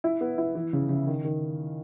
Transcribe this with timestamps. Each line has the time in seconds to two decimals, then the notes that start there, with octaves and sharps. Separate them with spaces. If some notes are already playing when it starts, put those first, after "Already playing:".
0.04 E4
0.21 B3
0.38 E4
0.55 E3
0.73 C#3
0.89 C#3
1.07 D#3
1.24 D#3